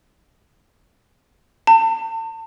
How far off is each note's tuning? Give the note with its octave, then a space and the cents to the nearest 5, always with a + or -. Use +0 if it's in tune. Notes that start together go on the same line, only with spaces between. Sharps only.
A5 +40